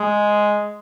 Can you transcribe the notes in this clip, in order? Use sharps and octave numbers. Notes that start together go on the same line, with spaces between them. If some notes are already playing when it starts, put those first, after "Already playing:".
Already playing: G#3